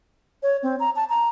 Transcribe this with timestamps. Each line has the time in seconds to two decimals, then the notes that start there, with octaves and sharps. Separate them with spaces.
0.43 C#5
0.63 C4
0.80 A#5
0.96 A5
1.10 A#5